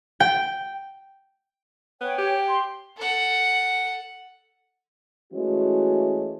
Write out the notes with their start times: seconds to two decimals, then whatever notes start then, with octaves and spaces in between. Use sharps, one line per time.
0.20 G5
2.01 B3 C#5 G5 G#5
2.18 G4
2.47 C6
2.97 A4 F#5
5.33 E3 G#3 A3 C#4 F#4